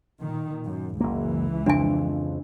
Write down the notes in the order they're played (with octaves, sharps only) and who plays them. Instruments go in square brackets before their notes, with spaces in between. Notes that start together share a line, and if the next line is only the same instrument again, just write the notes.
[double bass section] A#2 D#3
F#2
[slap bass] F#1 A#3 [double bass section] C#2 E3
[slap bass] F2 C#3 F3 [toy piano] D4 G#5